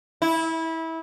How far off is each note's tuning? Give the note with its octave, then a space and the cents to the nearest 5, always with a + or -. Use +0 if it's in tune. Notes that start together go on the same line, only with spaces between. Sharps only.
E4 -20